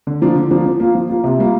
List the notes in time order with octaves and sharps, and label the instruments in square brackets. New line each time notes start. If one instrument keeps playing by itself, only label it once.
[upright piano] D3
F3 A#3 D4
D3
F3 A#3 D4
F3
A#3 F4
F3
A#3 F4
C3
G3 A#3 F4